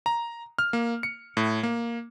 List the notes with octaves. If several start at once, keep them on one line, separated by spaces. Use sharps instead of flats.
A#5
F6
A#3
C#7
A2
A#3